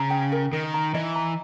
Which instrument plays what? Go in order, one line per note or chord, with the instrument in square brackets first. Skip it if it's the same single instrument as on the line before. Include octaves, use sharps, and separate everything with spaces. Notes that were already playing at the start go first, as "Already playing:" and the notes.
Already playing: [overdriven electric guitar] C#3 [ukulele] A#5
[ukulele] G5
A#4
[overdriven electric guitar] D#3 [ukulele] A#4
[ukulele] A#5
[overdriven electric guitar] E3 [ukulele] D#5
[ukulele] A#5